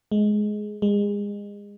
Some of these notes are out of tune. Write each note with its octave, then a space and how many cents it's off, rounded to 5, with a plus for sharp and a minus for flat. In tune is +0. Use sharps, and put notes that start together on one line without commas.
G#3 +15
G#3 -30